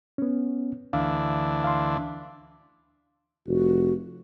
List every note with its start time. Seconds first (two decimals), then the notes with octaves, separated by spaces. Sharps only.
0.18 B3 C#4
0.93 D2 E3 D4 F5
1.64 F5 C6
3.47 F1 F#4